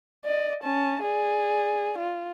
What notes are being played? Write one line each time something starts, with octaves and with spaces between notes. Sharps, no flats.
D5 D#5
C#4 A5
G#4 D5
F4